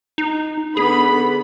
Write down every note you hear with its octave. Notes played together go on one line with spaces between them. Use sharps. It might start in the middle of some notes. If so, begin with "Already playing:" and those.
D#4
D3 B3 G#4 B5